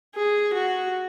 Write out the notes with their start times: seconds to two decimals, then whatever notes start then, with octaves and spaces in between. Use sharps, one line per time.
0.15 G#4
0.54 F#4